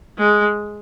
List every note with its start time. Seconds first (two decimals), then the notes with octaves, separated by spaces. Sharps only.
0.19 G#3